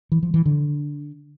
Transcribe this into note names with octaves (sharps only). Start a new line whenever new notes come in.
E3
F3
E3
D3